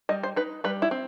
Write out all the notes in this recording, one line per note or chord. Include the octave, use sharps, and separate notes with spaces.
G3 D#5
C5
D#4 B4
G3 B4
E4
C4